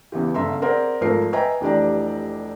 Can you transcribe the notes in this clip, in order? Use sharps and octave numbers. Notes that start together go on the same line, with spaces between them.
E2 C#3 E3 G4
G1 C#3 A4 E5 A#5 C6
C4 G#4 A#4 D5 F#5
G#1 F3 A3 A4 A#4 C7
B4 D#5 E5 G5 G#5 A#5
F1 E3 D4 G4 D5 A#5